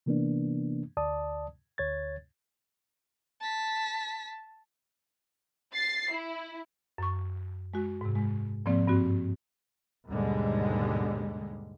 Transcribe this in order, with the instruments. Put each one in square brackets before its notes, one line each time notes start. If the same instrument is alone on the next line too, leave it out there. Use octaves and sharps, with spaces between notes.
[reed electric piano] C3 E3 A#3 B3 D4
D2 D5 A5 D#6
D2 C#5 G#6 A6
[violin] A5 B6
[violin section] A6 C7
E4
[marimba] F#2 C#6
G#3 F#4
G#2 C3
G#3
G#2 F3 A#3 C4 D5
G2 C4 F#4
[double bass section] D#2 G#2 B2 D3 G3 G#3